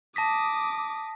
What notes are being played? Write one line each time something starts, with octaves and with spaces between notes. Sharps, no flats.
A5 D6 D#6 A#6 B6